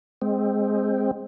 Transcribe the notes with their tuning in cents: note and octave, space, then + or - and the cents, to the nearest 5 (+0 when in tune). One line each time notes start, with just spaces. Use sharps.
G#3 +0 C4 +0